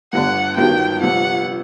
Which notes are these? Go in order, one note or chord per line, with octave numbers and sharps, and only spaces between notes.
G1 G2 D3 F#5
G1 G2 D#3 F#3 G5
G1 F2 C3 F#5